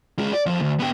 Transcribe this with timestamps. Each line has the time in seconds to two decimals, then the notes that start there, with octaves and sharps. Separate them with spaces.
0.18 G#3 F4
0.33 D5
0.46 F2 F3
0.60 D2
0.79 B3 G4